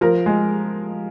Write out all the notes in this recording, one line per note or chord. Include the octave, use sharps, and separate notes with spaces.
F3 A#4
G#3